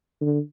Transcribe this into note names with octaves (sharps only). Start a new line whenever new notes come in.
D3